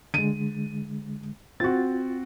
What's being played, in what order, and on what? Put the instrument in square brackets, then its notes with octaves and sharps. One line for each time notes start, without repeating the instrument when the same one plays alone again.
[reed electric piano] D3 G#3 [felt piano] D#7
[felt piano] C4 F#4 [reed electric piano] F4 A6